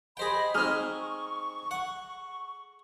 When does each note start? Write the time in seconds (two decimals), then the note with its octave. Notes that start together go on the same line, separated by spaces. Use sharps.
0.17 G#4 C5 D#5 G5 B5
0.55 C4 D#4 G#4 C#6 F6
1.71 F#5